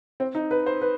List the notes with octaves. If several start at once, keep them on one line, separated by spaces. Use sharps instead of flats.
C4
D#4
B4
C5
B4